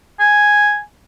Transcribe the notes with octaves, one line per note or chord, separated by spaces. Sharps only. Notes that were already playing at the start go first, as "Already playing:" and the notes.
G#5